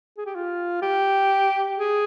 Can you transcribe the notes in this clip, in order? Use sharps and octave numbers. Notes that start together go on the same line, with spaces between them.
G#4
G4
F4
G4
G#4